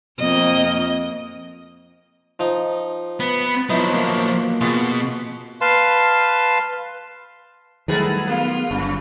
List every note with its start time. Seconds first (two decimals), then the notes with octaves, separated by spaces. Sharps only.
0.20 F2 A#3 D#5
2.40 F3 D#4
3.20 B3
3.70 F3 F#3 B3 D#4 E4
3.94 A#3
4.61 B2 F4 F#4 G#4
5.61 B4 F5 A5 C6
7.88 D#3 F#3 G3 A3 B3 E4 G#4 A#4
8.27 A#3 B3 F4
8.71 G1 F#2